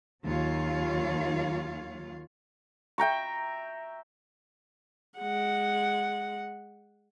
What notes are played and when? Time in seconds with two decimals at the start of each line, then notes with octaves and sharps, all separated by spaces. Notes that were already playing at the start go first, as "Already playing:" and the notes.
0.24 D#2 D#3 F#3 F4 C#5 F5
2.98 E5 G5 A#5 C#6
5.18 G#3 F#5